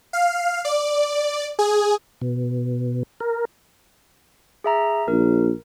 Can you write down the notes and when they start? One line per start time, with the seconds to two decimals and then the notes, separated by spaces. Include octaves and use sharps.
0.13 F5
0.65 D5
1.59 G#4
2.21 B2
3.20 A#4
4.64 G#4 E5 A#5
5.08 A#1 A#4